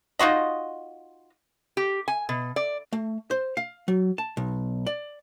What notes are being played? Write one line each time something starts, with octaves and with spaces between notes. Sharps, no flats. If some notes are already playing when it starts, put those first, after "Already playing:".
D#4 F4 F#4 D#5
G4
G#5
B2
D5
A3
C5
F5
F#3
A5
B1
D5